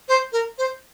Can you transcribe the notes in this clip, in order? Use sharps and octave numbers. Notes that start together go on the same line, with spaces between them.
C5
A#4
C5